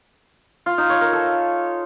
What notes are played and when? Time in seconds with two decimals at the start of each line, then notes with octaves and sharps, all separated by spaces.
0.66 F4
0.78 D#4
0.89 C#5
1.01 A#4
1.13 A4